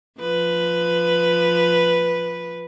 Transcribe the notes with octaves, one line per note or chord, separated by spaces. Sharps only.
F3 B4